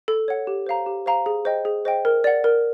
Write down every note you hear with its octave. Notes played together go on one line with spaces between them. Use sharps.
A4
C#5 F#5
G4
C5 F5 A#5
G4
C5 F5 A#5
G#4
C5 D#5 G5
G#4
C5 D#5 G5
A#4
D5 F#5
A#4